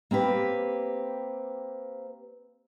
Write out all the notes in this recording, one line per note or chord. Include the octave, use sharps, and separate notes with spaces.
A#3 C4 G4 B4